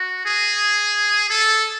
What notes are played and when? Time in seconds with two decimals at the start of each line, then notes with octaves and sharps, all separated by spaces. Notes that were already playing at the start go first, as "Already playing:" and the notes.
Already playing: F#4
0.26 G#4
1.30 A4